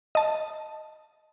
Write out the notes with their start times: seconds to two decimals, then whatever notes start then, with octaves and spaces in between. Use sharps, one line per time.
0.15 D#5 A5